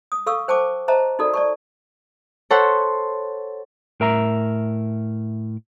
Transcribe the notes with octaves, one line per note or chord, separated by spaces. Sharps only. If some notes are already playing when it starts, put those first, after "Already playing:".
D#6
A4 F5 C#6 E6
C5 G5 A5 C#6 D6
C5 D#5 E5 A5 A#5
D#4 F#4 A4 A#4 D5
D5 A5 C#6
A4 C5 C#5 F#5 B5
A2 A#4 E5 A#5